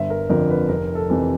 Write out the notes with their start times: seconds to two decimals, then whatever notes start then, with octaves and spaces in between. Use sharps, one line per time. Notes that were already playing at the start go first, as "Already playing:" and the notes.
Already playing: G1 E5
0.10 A#4
0.29 F2 D3 F3 A#4
0.50 B4
0.69 F1 A#4
0.95 A4
1.10 F2 C3 E3